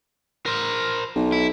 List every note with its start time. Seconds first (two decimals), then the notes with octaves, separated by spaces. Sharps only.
0.46 A#4 C5
1.15 B1
1.32 E4